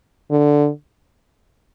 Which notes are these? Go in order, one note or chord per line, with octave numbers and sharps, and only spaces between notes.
D3